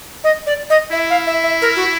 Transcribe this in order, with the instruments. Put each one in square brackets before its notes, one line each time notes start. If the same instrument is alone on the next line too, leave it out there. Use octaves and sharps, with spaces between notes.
[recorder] D#5
D5
D#5
[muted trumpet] E4 [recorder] E5
[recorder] F5
E5
E5
A#4
F#4